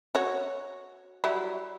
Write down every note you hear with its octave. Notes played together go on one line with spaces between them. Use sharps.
F#4 C#5
F#3 G3 E4